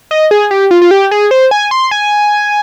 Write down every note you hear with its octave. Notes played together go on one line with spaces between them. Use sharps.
D#5
G#4
G4
F4
F4
G4
G#4
C5
G#5
C6
G#5